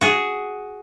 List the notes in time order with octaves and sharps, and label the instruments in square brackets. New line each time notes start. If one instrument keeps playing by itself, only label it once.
[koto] F#4 G#4